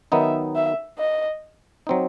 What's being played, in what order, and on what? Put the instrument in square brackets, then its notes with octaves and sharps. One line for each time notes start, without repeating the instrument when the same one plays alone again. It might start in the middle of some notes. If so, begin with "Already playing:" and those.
[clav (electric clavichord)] D#3 F#3 B3 D#4 [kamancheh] E5
[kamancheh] E5
D#5
[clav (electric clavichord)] F#3 C4 D#4